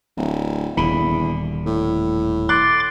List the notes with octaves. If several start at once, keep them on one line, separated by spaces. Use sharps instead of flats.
D1
D#1 E2 D3 B5
A2
C6 D6 F#6 A6